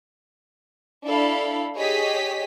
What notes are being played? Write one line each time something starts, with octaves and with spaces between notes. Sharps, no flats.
D4 E4 A4 F5 B5
G4 G#4 C#5 D#5 B6